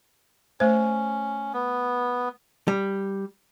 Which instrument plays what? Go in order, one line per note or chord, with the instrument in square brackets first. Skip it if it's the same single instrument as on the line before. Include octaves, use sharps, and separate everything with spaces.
[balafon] A3 C5 [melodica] C#4
[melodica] B3
[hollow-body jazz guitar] G3